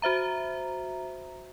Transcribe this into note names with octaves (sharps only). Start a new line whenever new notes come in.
F#4 C5 E5 A#5